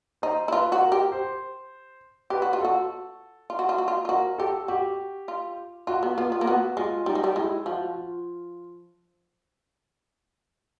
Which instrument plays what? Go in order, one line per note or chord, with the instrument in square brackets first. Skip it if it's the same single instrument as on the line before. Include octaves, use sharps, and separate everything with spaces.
[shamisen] D#4 [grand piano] C5
[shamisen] E4
[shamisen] F4 [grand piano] B4
[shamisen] F#4
[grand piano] A#4
[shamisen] G4
[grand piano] C5
[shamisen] G4 [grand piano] B4
[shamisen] F#4
F4
[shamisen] F#4 [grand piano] A4
[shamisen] F4
F#4
F4
F#4
F4
F4
[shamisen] F#4 [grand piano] A#4
[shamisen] G4 [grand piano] A4
[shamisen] F#4 [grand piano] G4
[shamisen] F4
[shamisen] F4 [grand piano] F#4
[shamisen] B3
[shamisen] B3 [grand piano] F4
[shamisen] B3
A#3
[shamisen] B3 [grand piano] F#4
[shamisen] G#3 [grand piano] F4
[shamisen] G3 [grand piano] D#4
[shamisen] G#3
G3
[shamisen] G#3 [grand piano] E4
[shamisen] F3 [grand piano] F#4
[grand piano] F4